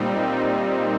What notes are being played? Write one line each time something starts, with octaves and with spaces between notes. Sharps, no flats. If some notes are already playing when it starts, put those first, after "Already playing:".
Already playing: A#2 G3 C4 D#4